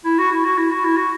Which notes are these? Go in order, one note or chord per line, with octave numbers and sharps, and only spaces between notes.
E4
F#4
E4
F#4
E4
F#4
E4
F#4